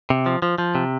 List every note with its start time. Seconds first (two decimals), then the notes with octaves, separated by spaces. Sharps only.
0.10 C3
0.26 F3
0.42 F3
0.58 F3
0.75 C3